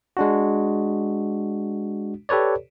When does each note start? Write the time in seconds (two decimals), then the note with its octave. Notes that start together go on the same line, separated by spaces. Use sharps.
0.17 G#3 D4 F#4
2.29 G4 A4 B4 C#5 D5